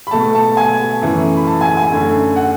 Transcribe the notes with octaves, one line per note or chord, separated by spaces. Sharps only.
B5
B2 A3 A5
A5
G#5
F#2 E3 A3
B5
A5
G#5
G#5
F#2 D3 A3
F#5